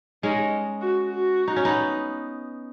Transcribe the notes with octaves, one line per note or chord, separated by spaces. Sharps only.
G#3 C#4 D#4
F#4
F#4
D#4
C#4
B3 D#4